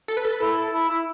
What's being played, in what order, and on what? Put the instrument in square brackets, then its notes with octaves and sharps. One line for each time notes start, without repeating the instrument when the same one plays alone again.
[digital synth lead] A4
B4
A4
B4
[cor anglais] E4 [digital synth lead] A4
[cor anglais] E4
E4